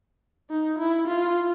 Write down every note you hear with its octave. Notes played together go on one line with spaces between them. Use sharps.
D#4
E4
F4